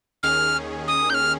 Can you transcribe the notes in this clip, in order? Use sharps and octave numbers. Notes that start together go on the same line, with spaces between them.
D#2 D#3 C#4 G#4 F6
D#6
G6
F6